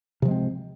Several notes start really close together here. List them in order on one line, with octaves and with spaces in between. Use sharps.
C3 F3 G#3 C4